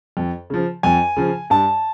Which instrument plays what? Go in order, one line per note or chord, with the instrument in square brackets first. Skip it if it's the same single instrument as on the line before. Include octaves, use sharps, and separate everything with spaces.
[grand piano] F2
C#3 F3
F2 G#5
C#3 F3
G2 A5